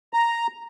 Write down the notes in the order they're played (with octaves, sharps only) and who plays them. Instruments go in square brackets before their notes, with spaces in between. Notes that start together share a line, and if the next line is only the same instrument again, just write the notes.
[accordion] A#5